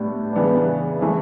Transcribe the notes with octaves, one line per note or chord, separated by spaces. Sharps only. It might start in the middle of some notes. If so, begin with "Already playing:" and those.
Already playing: A2 G3 B3 D4
C#3 E3 B3 D4
C#3 E3 A3